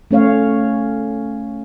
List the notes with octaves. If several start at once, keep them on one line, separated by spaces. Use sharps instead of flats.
A3 C#4 C#5 F5